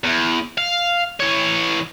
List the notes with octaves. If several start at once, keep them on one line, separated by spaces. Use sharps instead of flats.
E2
F5
E3 C#5